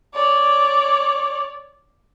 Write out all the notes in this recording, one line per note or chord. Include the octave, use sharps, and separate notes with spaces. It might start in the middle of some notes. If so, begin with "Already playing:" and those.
C#5 D5